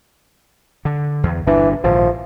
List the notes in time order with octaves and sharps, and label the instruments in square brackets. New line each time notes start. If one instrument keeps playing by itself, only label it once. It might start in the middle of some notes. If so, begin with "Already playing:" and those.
[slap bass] D3
E2
[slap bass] G1 A#2 D4 [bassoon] E3
[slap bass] A#1 G#2 D#3 [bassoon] F3